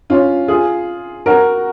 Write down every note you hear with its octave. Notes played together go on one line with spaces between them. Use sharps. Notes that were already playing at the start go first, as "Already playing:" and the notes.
C#4 F4
F4 G#4
F#4 A#4